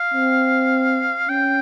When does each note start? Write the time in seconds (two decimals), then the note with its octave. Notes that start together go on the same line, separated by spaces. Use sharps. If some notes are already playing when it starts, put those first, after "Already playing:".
Already playing: F5
0.14 C4
1.29 C#4 G5